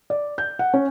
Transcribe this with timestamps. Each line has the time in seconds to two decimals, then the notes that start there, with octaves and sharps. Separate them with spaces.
0.10 D5
0.38 G6
0.59 F#5
0.74 C#4